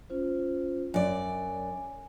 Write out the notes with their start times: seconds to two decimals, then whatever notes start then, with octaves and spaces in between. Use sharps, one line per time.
0.10 C#4 F4 C5
0.94 F#2 D5 G#5